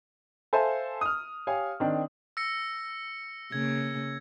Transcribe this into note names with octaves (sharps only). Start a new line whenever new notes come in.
A4 C5 E5 F5 G#5 A5
D#6 F6
G4 C#5 F5 G#5
D#3 C4 D4
E6 A#6 C#7
C#3 A#3 G#6